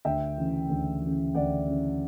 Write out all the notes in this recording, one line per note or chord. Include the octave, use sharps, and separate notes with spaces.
D2 E5 G5
C#3 E3
D2
C#3 E3
D2 D5 F#5
C#3 E3